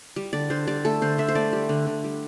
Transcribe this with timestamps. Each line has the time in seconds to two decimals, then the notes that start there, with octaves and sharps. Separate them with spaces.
0.16 G3
0.33 D3 D5
0.50 D3 C5
0.67 G3 D5
0.85 A3 A4
1.02 D3 C5
1.18 D3 E5
1.28 C5
1.35 A3 D5
1.53 G3
1.69 D3
1.87 D3
2.04 G3